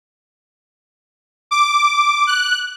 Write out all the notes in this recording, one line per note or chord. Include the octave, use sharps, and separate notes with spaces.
D6
F#6